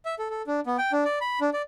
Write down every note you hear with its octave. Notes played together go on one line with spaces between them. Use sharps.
E5
A4
A4
D4
B3
G5
D4
D5
B5
D4
D5